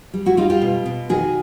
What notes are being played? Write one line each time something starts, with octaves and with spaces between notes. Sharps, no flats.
G3
E4 F#4
G3 D#4 F4
F4 G4
B2
B2
D#3 F#4 G#4